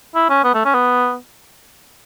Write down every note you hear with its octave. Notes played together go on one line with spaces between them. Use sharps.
E4
C#4
B3
A3
C#4
B3